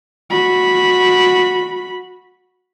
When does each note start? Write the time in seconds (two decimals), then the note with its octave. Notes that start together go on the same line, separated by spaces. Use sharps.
0.30 F#4 B5